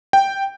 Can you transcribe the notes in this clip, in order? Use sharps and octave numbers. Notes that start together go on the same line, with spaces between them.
G5